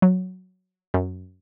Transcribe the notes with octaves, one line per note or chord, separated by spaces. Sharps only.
F#3
F#2